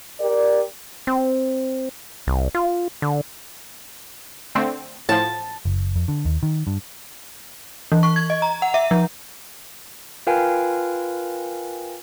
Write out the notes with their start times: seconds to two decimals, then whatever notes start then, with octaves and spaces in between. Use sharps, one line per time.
0.20 G4 A#4 D5
1.07 C4
2.27 C2
2.55 F4
3.02 D3
4.55 D3 A3 C4
5.09 A2 F3 A5
5.65 F#1
5.96 F2
6.08 D3
6.25 D#2
6.43 D#3
6.67 G2
7.92 E3
8.03 C#6
8.16 G#6
8.30 D#5
8.42 A#5
8.62 F#5
8.74 E5
8.91 F3
10.27 F4 A#4 B4 F5 G5 G#5